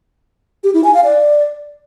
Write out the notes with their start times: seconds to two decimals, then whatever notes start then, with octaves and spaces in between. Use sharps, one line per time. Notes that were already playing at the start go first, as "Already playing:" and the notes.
0.64 G4
0.74 E4
0.84 G#5
0.94 F5
1.04 D5